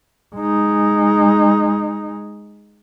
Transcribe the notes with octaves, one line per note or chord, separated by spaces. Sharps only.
G#3 D#4